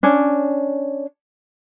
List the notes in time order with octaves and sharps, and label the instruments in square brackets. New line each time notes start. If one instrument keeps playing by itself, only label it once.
[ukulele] C#4 D4